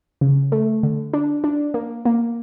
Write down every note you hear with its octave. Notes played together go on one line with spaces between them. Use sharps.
C#3
A3
D3
D4
D4
A#3
A#3